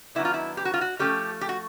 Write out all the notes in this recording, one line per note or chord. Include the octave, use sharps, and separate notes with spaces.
D#3 F#3 B3 D4 E4
F4
E4
G4
F#4
F4
F#4
F3 A3 C#4 G4
G4
F#4